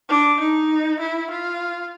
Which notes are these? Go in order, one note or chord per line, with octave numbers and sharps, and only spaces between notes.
D4
D#4
E4
F4